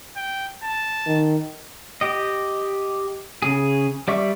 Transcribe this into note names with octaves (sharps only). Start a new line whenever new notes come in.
G5
A5
D#3
G4 D#5
C#3 G#4
G3 D5 E5 C#6